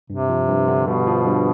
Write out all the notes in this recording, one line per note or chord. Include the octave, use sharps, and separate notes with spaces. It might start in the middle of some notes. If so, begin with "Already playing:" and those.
G2 C3
F3
G2
D3
G2 B2
F3
G2